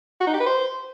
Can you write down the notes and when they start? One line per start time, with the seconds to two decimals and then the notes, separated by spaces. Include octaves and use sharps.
0.21 F#4
0.27 D#4
0.33 G4
0.40 B4
0.46 C5